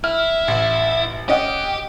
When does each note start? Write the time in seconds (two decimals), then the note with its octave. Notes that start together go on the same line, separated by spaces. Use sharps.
0.04 E4 F6
0.48 A1
1.29 C#4 G4 D#5 F#5